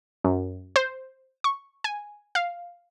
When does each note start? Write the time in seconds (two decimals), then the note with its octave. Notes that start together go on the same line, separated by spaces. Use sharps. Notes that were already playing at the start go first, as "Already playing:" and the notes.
0.24 F#2
0.76 C5
1.44 C#6
1.84 G#5
2.35 F5